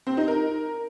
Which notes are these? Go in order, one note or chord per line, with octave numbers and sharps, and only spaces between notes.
C4
D#4
A#4